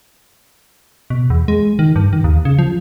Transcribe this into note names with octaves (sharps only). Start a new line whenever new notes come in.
B2
E2
G#3
D#3
G2
D#3
D#2
C#3
F3